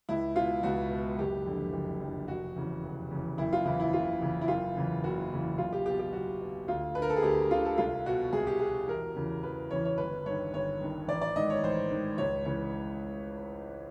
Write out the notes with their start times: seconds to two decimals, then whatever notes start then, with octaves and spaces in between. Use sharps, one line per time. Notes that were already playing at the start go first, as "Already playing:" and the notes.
0.09 C#2 E4
0.35 B2 F4
0.63 C#2 F#4
0.90 B2
1.18 F#1 G4
1.46 F2 D3
1.73 F#1
2.01 F2 D3
2.28 F1 F#4
2.56 E2 C#3
2.83 F1
3.11 E2 C#3
3.38 F#1 E4
3.53 F4
3.65 E2 C#3 E3 E4
3.80 E4
3.93 F#1 F4
4.21 E2 C#3 E3
4.41 E4
4.48 F#1 F4
4.76 E2 C#3 E3
5.04 F#1 F#4
5.31 E2 C#3 E3
5.58 B1 F4
5.73 G4
5.86 B2 G4
6.00 G4
6.13 B1 F#4
6.41 B2
6.68 D2 F4
6.95 D3 B4
7.02 A#4
7.09 A4
7.16 G#4
7.23 D2 G4
7.51 D3 F4
7.65 A4
7.78 C2 F4
8.06 B2 F#4
8.33 C2 G#4
8.47 G4
8.59 B2 G#4
8.88 E1 A#4
9.15 E2 C#3 E3
9.43 E1 B4
9.71 E2 C#3 E3 C#5
9.85 C#5
9.98 G1 B4
10.26 G2 D#3 C#5
10.54 G1 C#5
10.80 G2 D#3
11.08 A1 D5
11.21 D5
11.36 G#2 D#3 D#5
11.50 C#5
11.64 A1 C5
11.91 G#2 D#3
12.18 C#2 C#5
12.45 C#3 E3 C#5